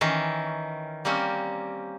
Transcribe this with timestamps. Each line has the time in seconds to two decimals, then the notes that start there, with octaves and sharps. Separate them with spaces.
0.01 D#3 E3 C#4
1.05 G3 A#3 C4 C#4